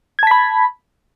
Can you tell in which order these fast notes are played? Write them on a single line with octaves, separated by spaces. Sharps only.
G#6 A5 B6 B5